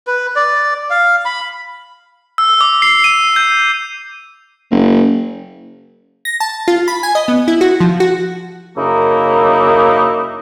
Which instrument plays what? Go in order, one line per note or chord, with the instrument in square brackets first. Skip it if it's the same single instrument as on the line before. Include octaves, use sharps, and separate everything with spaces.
[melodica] B4
D5
F5
B5
[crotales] E6
D6
C7
D#7
G6
[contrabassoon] F#1
[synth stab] A#6
A5
F4
B5
G#5
D#5
B3
E4
F#4
F3
F#4
[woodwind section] F#2 C#3 A#3 D#4 E4